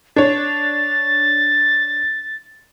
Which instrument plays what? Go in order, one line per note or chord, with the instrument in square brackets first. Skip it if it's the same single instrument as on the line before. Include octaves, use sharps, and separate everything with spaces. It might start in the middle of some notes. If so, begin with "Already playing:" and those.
[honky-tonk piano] D4 C#5 [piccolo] A6